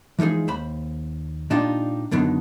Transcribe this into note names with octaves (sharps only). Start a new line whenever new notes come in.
E3 F3 G#3 D#4 G#4
D#2 C5 B5
A#2 D4 D#4 F4 G4
F#2 B2 D3 D#3